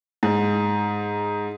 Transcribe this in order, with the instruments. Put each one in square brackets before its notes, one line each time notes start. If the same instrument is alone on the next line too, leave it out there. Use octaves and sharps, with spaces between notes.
[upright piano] G#2